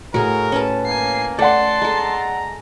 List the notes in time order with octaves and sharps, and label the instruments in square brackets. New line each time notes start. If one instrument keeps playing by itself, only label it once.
[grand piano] A2 [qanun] F#4 G#4 F5 [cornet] A#4
[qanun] C#4 B4 A5
[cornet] A#3 [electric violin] G#5 C7
[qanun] A3 [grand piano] D5 F#5 [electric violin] A5 C6
[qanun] G#3 A4 [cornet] A#5